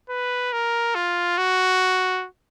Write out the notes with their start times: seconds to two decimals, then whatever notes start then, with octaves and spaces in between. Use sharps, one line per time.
0.10 B4
0.52 A#4
0.95 F4
1.38 F#4